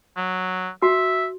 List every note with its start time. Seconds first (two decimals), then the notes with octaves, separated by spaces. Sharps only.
0.17 F#3
0.82 F#4 E5